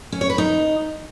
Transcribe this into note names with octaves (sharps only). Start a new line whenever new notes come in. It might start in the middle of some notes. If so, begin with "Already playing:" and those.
C#4
C#5
B4
D#4